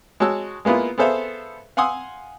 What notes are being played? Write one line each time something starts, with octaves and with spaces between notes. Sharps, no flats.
G#3 F#4 C#5 A5 E6
G#3 A#3 B3 E4 F4
B3 G#4 A4 C5 E5 F5
F5 F#5 G#5 C6 D#6 E6